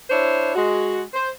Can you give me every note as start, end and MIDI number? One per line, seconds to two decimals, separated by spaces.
0.10 0.55 62
0.10 0.55 64
0.10 0.55 72
0.10 0.55 73
0.55 1.02 56
0.55 1.02 66
1.14 1.28 72